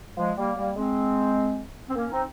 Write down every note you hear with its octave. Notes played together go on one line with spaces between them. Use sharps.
F3 G#3
G3 A#3
G3 A#3
G#3 C4
C4
A#3 C#4
C4 D#4